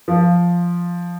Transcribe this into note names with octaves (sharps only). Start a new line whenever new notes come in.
F3